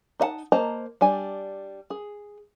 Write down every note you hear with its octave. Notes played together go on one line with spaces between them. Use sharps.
D#4 D#5 F#5 A5
A#3 C5 D#5 A5 A#5
G3 D4 G#5
G#4